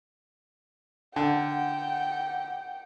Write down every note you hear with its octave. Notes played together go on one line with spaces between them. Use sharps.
D3 F#5 G5